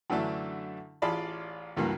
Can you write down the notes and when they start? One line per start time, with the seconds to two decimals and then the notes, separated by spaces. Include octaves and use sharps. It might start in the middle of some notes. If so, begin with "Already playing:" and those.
0.10 F#2 D3 E3 F#3 A3 D4
1.02 A1 F4 G#4 D5 A5 B5
1.77 C#2 G2 E3 F#3 A#3